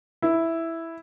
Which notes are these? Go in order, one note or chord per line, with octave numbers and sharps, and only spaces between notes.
E4